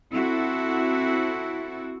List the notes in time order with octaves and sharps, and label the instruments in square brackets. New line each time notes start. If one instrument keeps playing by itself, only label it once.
[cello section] C4 E4 F#4 A4